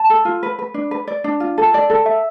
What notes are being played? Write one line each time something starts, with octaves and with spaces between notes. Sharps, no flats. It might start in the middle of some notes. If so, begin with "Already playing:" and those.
Already playing: A5
A4
F4
B4
B4
D4
B4
D5
D4
F4
A4
D5
A4
E5